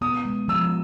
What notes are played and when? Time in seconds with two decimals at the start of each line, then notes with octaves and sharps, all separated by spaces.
0.01 B3 D#6
0.25 G#3
0.48 F3 E6